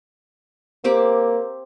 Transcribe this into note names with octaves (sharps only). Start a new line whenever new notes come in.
A#3 C4 G4 D6